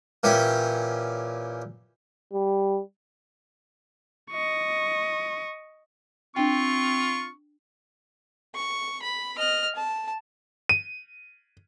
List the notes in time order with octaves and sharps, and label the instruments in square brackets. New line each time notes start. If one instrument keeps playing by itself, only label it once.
[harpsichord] A#2 E3 C#4 G4
[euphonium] G3
[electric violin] D#5 C#6
[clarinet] C4 [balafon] D4 G5 [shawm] F4 [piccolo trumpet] C#6
[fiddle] C#6
B5
D#5 F6
A5
[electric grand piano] D#7